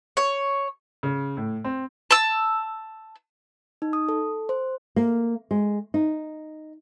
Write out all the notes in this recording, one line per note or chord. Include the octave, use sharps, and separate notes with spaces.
C#5
C#3
A2
C4
A5 E6
D#4
D#6
A4
C5
A#3
G#3
D#4